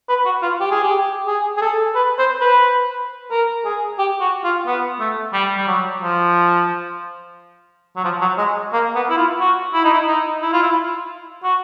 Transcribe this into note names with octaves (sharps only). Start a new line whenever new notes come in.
B4
F#4
F4
G4
G#4
G4
G#4
G#4
A4
B4
C5
B4
A#4
G#4
G4
F#4
F4
B3
A3
G3
G3
F#3
F3
F#3
F3
F#3
G#3
A#3
B3
E4
F4
F#4
E4
D#4
E4
D#4
E4
F4
E4
F#4